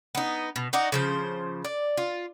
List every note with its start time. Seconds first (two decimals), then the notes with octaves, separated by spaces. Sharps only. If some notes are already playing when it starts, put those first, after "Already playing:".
0.15 B3 D#4
0.56 B2
0.73 D#4 F#4 D5 D#5
0.92 C#3 F3 C5
1.65 D5
1.97 F4